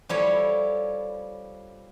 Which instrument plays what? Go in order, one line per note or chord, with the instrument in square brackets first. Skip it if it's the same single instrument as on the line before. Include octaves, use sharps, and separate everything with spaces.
[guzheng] F3 G3 E4 A4 C#5